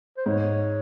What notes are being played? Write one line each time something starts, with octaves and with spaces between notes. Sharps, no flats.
C5
G#2 C#5